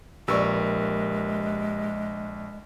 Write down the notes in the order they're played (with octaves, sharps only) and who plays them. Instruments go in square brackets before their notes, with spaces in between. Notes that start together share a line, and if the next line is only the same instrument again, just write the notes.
[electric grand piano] A#1 [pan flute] G#3 [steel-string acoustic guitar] G4 A#4 B4 [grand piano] D5 C#6 E6